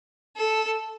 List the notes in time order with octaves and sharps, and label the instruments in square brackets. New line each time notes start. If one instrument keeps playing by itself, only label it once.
[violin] A4